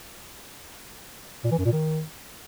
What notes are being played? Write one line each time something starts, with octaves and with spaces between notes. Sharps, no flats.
A#2
E3
F#2
A#2
D#3